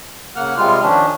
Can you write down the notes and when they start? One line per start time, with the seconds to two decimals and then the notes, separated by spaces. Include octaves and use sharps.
0.36 C#3 A#3 F#5 F6
0.57 C3 G3 G#3 F4 F6
0.83 D#3 F3 C#4 D4